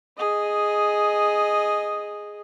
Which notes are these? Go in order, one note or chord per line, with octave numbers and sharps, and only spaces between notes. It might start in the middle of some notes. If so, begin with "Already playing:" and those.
G#4 D#5